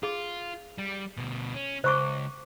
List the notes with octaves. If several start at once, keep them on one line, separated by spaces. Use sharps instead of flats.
F4 G#4
G3
D2 B2
C#4
C#2 C5 C#6 D6